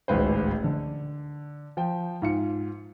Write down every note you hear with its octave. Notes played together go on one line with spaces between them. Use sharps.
D1 G#1 C#2 C#3 B4 C5
D3
F3 G5
G#2 F4 C#7